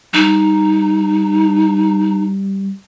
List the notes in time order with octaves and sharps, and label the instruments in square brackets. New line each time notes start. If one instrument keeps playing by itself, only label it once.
[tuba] G3 [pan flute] D#4